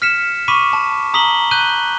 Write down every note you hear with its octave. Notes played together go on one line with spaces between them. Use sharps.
F6 B6 C#7 E7
B5 C#6 D6 B6 D#7
A5
A#5 D#6 B6 F#7 G7
F#6 G6 D#7 G7